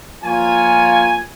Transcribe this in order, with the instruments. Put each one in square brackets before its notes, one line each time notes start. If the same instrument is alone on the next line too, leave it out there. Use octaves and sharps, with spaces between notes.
[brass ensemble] F3 A#3 F4 C#5 G#5